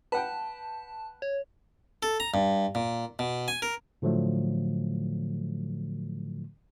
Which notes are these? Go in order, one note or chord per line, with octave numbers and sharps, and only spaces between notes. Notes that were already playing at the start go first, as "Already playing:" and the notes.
B4 F#5 G5 A5
C#5
A4
A#5
G2
A#2
B2
G#5
A#4
A2 D3 F3 F#3 A3